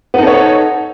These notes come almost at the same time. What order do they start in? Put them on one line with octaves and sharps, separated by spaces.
B3 D#4 A4 C#5